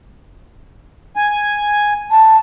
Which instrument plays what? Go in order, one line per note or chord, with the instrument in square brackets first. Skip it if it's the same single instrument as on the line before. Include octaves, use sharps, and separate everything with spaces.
[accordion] G#5
[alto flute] A5